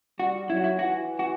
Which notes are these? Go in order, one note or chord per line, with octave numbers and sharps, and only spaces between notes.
G3 F#4
F#3 E4
F#4
E4
E3 F#4
F#4